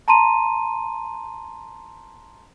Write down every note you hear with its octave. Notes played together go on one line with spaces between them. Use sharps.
A5 A#5 C6 D#7